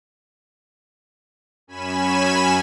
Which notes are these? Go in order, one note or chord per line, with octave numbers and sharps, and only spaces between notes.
F#2 C#4 G#5 B5 E7